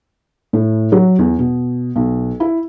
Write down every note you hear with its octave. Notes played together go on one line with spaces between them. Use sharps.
A2
F#3
E2
B2
B1
E4